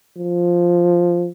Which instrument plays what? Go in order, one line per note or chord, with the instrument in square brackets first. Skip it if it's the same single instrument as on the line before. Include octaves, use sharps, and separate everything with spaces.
[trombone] F3